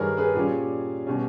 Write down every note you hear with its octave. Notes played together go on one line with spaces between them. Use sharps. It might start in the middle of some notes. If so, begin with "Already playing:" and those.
Already playing: G2 D#3 G3 G#4 A#4 B4 C#5
G#4 B4
A#2 G3 C#4 G#4
B2 G3 C#4